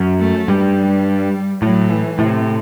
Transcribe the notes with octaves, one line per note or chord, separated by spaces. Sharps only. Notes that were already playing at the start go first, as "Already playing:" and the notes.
Already playing: F#2
A3
G2 G3
A2 F#3
E3
A2 C3